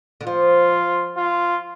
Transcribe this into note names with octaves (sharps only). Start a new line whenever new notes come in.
D3
F3 F4
F4